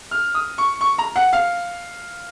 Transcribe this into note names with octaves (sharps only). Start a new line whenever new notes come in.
F6
D#6
C#6
C#6
A#5
F#5
F5